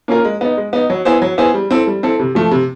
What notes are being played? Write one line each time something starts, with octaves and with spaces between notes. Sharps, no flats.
A#3 C#4 F4 A#4
G#3
B3 D#4
G#3
B3 D#4
F#3
B3 E4 G#4 C5
F#3
B3 E4 G#4 C5
G3
C4 E4 A4
G3
C4 E4 A4
C3
F3 A3
C3